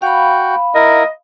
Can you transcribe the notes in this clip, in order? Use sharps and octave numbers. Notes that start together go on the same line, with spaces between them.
F#4 F5 G5 B5
E4 A#4 D#5